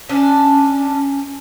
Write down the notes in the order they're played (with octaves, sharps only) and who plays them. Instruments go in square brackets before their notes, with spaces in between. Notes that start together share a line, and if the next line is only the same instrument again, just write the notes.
[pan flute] C#4 [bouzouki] D4